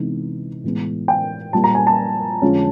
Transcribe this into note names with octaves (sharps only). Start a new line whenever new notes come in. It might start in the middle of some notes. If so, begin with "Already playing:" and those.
Already playing: C3 E3 G#3 B3 D#4
A2 E3 G#3 B3
G5
A#2 G3 A#3 A5
A#5
G#5
A5
F2 D3 F3 G#3 C#4